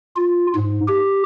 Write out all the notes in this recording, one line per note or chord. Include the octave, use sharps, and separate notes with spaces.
F4
G#2
G4